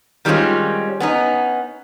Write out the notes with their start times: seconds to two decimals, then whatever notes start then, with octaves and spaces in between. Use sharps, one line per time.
0.25 D#3 G3 G#3 C4 C#4 F4
1.00 B3 C#4 D#4